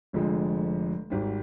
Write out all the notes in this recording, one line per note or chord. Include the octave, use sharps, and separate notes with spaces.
F1 F2 D3 F3 G#3
G#1 G#2 G3